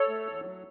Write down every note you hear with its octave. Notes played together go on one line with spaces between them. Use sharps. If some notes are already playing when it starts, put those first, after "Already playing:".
Already playing: A4 C#5
A3
E2
F#3